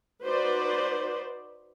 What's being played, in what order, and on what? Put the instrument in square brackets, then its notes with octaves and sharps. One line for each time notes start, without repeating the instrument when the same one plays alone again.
[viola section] D#4 F#4 B4 C5 D5